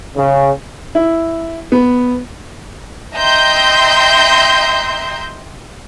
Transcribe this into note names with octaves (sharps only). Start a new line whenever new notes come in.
C#3
E4
B3
D#5 E5 G5 A#5 C6 G6